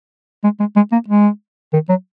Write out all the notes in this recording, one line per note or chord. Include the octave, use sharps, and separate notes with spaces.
G#3
G#3
G#3
A#3
G#3
D#3
F#3